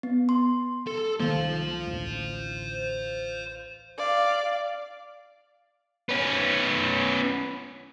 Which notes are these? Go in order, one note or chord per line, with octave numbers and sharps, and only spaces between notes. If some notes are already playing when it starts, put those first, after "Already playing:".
B3
C6
A4
C2 D#3 A#3 C5 F5
A1 D2
D5 F5
B3 C#4